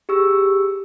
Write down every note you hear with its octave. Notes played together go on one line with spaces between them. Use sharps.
G4 G#4 C#6 E6